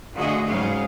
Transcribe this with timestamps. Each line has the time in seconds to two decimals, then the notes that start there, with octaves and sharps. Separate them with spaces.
0.14 A#2 D3 A3 F#4 G#4 D#5
0.45 G#2 C#3 F#3 G3 G#4 F5